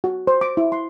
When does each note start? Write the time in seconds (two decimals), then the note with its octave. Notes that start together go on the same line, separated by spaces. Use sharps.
0.04 F#4
0.27 C5
0.41 D6
0.57 E4
0.72 C6